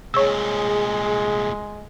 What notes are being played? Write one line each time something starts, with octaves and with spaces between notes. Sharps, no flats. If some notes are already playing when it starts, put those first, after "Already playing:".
C2 A#2 G#3 G#4 C#5 E6